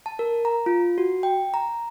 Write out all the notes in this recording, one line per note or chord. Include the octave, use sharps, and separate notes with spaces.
A5
A#4
A#5
F4
F#4
G5
A#5